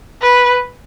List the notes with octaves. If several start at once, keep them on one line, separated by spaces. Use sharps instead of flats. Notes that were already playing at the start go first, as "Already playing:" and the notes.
B4